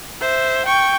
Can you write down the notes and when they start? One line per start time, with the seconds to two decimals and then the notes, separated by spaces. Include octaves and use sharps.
0.21 C5 E5
0.66 G5 C#6